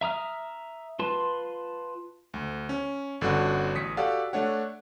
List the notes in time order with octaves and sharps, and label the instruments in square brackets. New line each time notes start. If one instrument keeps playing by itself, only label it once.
[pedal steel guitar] E5 A#5 D#6 F6
F4 B4 A5 C6
[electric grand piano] D2
C#4
G1 D3 C#4 D4 F#4 F#5
A1 D#6 B6 C#7
F#4 G4 A4 D5 F5 F#5
A3 D4 C#5 F#5